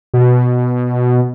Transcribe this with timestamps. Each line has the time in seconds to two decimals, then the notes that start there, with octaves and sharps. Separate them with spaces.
0.14 B2